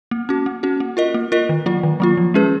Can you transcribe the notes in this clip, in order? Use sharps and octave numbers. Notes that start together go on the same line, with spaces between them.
A#3
C#4 F#4
A#3
C#4 F#4
A#3
F4 A#4 D#5
A#3
F4 A#4 D#5
D#3
F#3 A#3 F4
D#3
F#3 A#3 F4
F3
G#3 C#4 G#4 B4